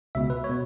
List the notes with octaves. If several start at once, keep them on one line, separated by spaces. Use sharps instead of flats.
C#2 B2 E5
B4
C#5
B2